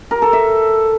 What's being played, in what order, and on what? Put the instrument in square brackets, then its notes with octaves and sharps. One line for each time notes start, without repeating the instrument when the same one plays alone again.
[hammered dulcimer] A#4
A4
E5